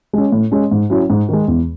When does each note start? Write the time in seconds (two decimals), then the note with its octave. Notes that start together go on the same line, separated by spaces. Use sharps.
0.13 G#3 C#4
0.32 A2
0.52 G#3 C#4
0.71 G#2
0.90 F#3 C#4 E4
1.10 G#2
1.29 D#3 G#3
1.48 E2